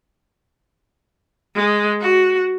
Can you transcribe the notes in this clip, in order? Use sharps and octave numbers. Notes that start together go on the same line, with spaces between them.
G#3
F#4